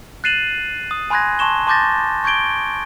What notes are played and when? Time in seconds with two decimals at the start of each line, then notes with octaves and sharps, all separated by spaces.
0.24 F#6 A6 C7 D#7 E7 F#7
0.91 D#6
1.10 G#5 B5 C6 F#6 G#6 A#6
1.39 A5 C6 C#6 E7 G7
1.67 A5 C6 D6 G6 A6 A#6
2.24 C#6 G6 G#6 D7 G7